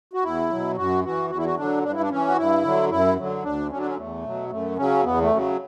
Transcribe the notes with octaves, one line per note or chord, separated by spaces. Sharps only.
F#4
E2 E4
B2 F#3
F#2 F#4
E3 F#4
E2 F#4
E4
F#4
D3 F#3 D4
G2 D4
E4
D4
E3 C#4
F#4
G2 E4
D3 F#3
F#2 E4
D3 F#3
D2 D4
D3 F#3 C#4
D4
C#4
E2 A3
B2 F#3
F#2 A3
C#3 F#3 C#4
E2 B3
A3
C#3 F#3